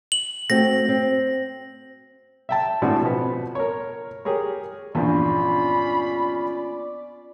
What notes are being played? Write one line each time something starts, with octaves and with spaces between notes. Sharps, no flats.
F#7
A3 C4 F#4 A#6
C4
E5 G5 A5
G#1 A2 D4 F#4 D5
B2 F3 B3
A#4 C#5
G4 G#4 A#4 C#5
A#1 E2 G2 B3 C#4 F4 D5 B5